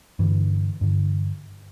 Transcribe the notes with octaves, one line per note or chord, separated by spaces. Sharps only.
G2 D3 E3
G2 D3